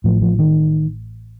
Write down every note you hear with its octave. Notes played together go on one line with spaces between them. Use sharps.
A1 A2 F3
F3
D#3